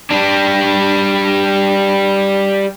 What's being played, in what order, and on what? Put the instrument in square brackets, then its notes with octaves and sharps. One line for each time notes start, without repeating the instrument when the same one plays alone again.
[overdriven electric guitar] G3 D4